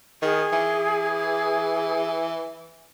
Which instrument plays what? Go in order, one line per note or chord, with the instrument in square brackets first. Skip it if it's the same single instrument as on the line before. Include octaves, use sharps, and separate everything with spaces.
[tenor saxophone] D#3 [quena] G#4
[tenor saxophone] E3